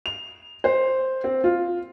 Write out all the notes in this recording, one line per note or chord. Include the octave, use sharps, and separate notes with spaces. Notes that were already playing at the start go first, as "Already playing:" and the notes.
F7
C5
C4
F4